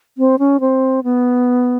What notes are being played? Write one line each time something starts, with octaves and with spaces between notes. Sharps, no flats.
C4
C#4
C4
B3